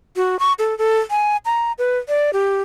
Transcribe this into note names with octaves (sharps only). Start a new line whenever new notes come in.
F#4
C#6
A4
A4
G#5
A#5
B4
D5
G4